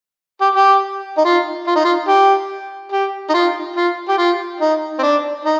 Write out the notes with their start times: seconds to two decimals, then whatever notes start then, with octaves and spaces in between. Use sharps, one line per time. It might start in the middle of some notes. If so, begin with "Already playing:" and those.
0.41 G4
0.55 G4
1.18 D#4
1.25 F4
1.67 F4
1.76 D#4
1.85 F4
2.08 G4
2.92 G4
3.29 D#4
3.34 F4
3.76 F4
4.09 G4
4.18 F4
4.60 D#4
4.99 C4
5.03 D4
5.45 D#4